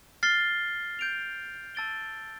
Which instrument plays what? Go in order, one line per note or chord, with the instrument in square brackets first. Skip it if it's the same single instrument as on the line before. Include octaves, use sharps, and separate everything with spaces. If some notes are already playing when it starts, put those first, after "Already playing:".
[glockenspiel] F6 A6 C7 G7
G6 D7 F7
A5 E6 A6 D7 G7